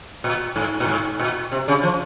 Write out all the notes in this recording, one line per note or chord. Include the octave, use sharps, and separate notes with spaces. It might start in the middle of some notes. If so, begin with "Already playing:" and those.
A#2
G#2
A#2
G#2
A#2
C3
C#3
F3